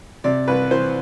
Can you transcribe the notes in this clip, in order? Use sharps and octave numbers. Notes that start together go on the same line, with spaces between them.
C3 D5
C2 B4
E3 C5